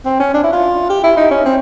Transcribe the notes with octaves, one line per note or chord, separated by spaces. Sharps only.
C4
C#4
D4
E4
F4
G4
E4
D#4
C#4
C4